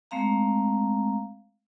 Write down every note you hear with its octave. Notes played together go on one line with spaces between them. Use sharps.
G#3 A3 C4 F5 A#5